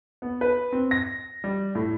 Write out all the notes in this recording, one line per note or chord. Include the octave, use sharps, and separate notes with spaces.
B3
B4
C4
A#6
G3
A2